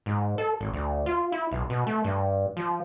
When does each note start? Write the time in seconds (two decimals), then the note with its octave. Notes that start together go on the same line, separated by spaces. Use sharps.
0.06 G#2
0.38 A4
0.61 G#1
0.74 D2
1.06 F4
1.32 E4
1.51 B1
1.70 B2
1.87 A3
2.04 G2
2.57 F3